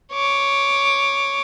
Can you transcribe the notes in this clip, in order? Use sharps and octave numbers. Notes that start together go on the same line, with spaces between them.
C#5 D6